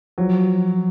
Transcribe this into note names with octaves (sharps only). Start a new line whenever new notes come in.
F3 F#3